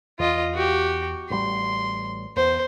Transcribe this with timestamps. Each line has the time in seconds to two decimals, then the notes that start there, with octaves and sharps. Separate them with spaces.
0.19 E2 F4 D#5
0.54 F#4 G4
1.30 A1 G3 C6
2.36 E2 C5